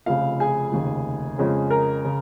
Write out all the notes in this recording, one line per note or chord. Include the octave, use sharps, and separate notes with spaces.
F1 F2 C#3 F5
G#4 G#5
F1 D#2 C#3
F2 C#3 G#3 C#4
A#4 A#5
C#3